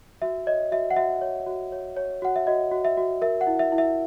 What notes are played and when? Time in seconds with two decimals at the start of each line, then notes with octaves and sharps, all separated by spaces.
0.22 F#4 E5
0.47 C#5 D#5
0.72 F#4 E5
0.91 F#5
0.96 F#4 E5
1.22 C#5
1.47 F#4
1.72 C#5
1.97 C#5
2.22 F#4 F#5
2.36 E5
2.47 F#4 D#5
2.71 F#4
2.85 E5
2.97 F#4
3.22 A#4 E5
3.41 F#5
3.47 E4
3.59 E5
3.72 E4
3.78 E5